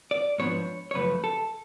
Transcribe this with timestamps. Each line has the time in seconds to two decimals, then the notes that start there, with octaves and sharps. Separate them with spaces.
0.11 D5
0.38 G#2 F3 B3 D4 C#5
0.91 C#5
0.94 F#2 C#3 F3 A3 B4
1.24 A4